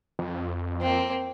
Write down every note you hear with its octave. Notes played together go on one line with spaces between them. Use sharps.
F2
A#3 C4